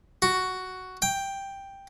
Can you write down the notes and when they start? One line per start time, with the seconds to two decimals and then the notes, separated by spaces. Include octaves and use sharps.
0.22 F#4
1.02 G5